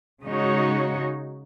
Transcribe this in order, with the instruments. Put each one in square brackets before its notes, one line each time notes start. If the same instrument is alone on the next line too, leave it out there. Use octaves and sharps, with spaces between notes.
[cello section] C#3 G#3 D#4 F#4 C#5